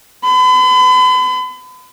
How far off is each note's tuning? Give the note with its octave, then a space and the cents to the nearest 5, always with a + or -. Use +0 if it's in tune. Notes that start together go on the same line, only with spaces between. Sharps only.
B5 +40